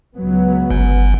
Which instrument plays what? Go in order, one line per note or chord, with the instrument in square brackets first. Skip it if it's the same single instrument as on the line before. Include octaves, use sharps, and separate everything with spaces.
[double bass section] C#2 F#3 B3
[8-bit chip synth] G1